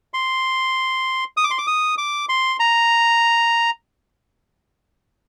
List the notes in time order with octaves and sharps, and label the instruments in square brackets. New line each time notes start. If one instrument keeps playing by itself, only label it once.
[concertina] C6
D#6
D6
C6
D6
D#6
D6
C6
A#5